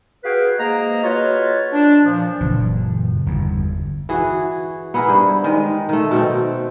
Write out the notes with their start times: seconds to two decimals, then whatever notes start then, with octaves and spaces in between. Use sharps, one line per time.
0.24 F#4 G#4 B4 F5 G5
0.58 G#2 A#3 D#5 A#5
1.03 D#4 F4 F#4 B4 C#5
1.73 D4
2.05 A#2 F3
2.41 F#1 A#2 E3
3.26 G1 E2
4.09 E3 F#4 G#4
4.94 B3 E4 G#4 A#4
5.08 G2 C5
5.44 D#3 G#3
5.89 D#3 A3
6.11 B2 A3 C4